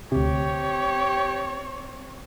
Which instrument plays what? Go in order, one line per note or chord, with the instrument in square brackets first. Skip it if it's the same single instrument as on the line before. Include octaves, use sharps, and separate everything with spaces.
[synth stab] D2 C3 [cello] C4 [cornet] G4 [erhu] C#5